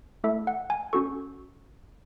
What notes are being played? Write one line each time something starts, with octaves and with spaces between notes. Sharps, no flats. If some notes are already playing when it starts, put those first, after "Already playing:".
A3 E4 A4 E5
F#5
G#5
C#4 F#4 A4 C#6